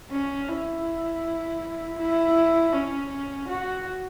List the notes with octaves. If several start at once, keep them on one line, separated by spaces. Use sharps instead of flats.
C#4
E4
E4
C#4
F#4